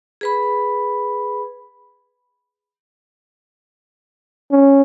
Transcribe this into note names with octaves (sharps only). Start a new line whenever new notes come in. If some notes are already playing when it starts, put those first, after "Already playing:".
G#4 B4 B5
C#4